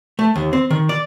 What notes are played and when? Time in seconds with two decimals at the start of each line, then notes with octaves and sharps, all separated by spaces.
0.19 A3
0.36 D#2
0.53 C4
0.70 D#3
0.89 D5